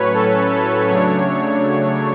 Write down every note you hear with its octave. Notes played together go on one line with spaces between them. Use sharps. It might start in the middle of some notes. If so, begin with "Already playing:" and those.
Already playing: A2 F#3 C#4 B4 C#5
A4
A4
C#3 F#3 A3 D4 C#5